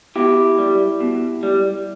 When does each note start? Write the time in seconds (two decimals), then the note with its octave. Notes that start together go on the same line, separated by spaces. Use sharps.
0.16 B2 E4 G4
0.58 G3
1.01 B2
1.43 G3